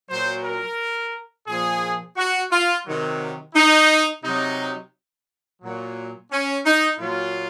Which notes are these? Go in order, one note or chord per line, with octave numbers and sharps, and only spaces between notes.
A#2 F#3 C5
A#4
A#2 F3 G#4
F#4
F4
C3 D#3 F#3
D#4
C3 F#3 D#4
A#2 F#3
C#4
D#4
A#2 F#3 F4